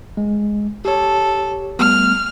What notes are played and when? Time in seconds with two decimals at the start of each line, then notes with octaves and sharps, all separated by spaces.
0.17 G#3
0.85 G4 A4 C#5
1.79 G3 A3 B3 F6